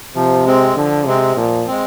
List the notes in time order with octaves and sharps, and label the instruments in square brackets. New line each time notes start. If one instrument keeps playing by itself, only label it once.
[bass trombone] C3 [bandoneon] F3
[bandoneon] G#3 C4
[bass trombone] D3 [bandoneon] F3
[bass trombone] C3 [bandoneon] G#3 C4
[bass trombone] A#2 [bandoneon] F3
[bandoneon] G#3 C4